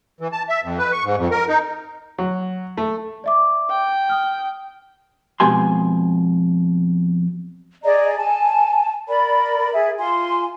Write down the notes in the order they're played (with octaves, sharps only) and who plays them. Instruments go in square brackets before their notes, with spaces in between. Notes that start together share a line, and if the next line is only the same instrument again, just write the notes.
[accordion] E3
A5
E5
F2
B4
C#6
G#2
F2
A#4
D#4
[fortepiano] F#3
A3
[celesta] D5 E5 D6
[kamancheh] G5
[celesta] D#6 F6
[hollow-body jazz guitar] F2 B2 G#3 G4 G#5 C6
[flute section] G#4 D5 D#5 A#5
G#5 A5
A#4 D5 B5
G#4 E5
F4 G#5 C6